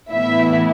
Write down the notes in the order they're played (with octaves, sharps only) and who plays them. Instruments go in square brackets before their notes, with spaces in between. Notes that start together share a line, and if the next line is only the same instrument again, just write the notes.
[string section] A2 E3 B3 E4 E5